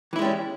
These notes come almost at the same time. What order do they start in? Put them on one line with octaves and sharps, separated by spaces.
E3 E4 G#3 G3 C#4